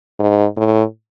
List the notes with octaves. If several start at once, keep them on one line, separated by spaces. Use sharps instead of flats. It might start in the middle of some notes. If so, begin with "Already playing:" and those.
G#2
A2